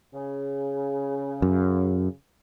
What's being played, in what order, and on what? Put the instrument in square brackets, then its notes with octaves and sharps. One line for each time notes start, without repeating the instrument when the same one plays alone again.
[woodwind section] C#3
[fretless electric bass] F#2